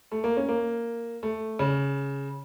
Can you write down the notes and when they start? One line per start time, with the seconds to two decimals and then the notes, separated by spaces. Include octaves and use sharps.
0.12 A3
0.24 A#3
0.37 C#4
0.49 A#3
1.23 A3
1.59 C#3